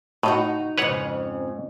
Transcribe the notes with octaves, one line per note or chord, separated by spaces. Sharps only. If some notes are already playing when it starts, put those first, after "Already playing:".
A2 D#4 F4 F#4
F2 G#2 C#3 B4 C#5 F#5